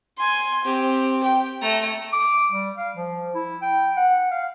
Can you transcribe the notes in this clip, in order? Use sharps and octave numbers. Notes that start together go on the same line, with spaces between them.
G#5 C6
C4 G4
G5
A3 A#5
D6
G3
F5
F3
E4
G5
F#5
F5